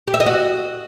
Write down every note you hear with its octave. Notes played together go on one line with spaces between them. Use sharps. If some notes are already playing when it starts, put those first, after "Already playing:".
G4
E5
D#5
F#4